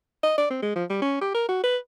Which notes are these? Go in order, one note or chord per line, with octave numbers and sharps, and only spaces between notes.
D#5
D5
C4
G#3
F3
G3
C#4
G4
A#4
F#4
B4